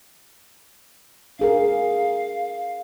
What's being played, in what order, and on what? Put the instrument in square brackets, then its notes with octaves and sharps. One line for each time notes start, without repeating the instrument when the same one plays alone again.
[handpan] D4 G#4 A#4 [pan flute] F5